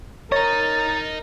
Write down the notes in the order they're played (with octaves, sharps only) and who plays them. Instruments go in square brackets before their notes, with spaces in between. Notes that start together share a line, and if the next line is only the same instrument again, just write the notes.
[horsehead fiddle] A#4 [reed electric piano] C#5 [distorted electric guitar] D#5 A#5 [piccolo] A6